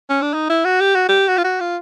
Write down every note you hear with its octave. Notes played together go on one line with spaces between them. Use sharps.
C#4
D4
D#4
E4
F#4
G4
F#4
G4
F#4
F4
F#4
F4